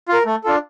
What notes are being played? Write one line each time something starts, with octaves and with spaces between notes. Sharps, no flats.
F4 A#4
A3
D4 F4 A4